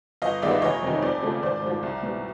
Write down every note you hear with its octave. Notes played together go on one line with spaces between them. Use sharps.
G1 D#5 F5
G2 D#3 G#3 B3 D5 E5
F1 C#5 D#5
F2 C3 D#3
F2 C5 D5
C#3 F3 A3
G#1 C5 D5
G#2 F3
C2
B2 G3